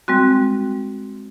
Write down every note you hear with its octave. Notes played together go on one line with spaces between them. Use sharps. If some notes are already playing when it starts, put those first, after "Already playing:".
G3 G#3 C4 F#4